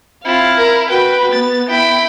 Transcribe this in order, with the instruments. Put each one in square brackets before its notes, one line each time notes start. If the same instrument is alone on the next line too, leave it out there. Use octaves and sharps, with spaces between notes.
[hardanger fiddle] C4 F4 [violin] E4 [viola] F5
[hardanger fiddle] A#4
[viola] F#4 B5 [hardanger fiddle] B4 [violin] G5
[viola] B3 [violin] A6
[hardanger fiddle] E4 B5 [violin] G5